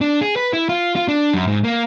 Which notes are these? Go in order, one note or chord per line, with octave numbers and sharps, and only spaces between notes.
D4
G#4
B4
E4
F4
F4
D4
F#2
G#2
A#3